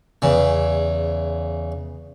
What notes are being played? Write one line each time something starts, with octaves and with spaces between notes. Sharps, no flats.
E2 C#3